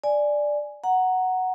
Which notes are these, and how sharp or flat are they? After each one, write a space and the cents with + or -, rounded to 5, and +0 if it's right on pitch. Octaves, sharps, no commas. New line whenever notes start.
D5 +0 G#5 +0
F#5 +0 A#5 +0